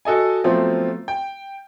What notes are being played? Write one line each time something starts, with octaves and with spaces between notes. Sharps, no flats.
F#4 A4 D#5 G#5
F3 F#3 A3 B3 C4 F4
G5